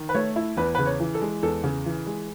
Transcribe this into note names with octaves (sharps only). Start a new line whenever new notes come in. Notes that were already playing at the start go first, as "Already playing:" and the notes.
Already playing: D#3
B4
A3 C#5
E4
E2 B4
C#3 B4
C#5
E3
A4
G#3
E2 A4
C#3
E3
G#3